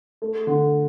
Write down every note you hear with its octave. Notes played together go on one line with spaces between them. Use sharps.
A3
D3